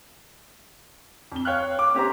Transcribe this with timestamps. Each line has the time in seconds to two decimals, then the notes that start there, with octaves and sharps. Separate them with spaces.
1.32 F2 G7
1.45 C#5 F5 G5 F6 F#6
1.79 D6
1.94 C#4 G4 C5 A#5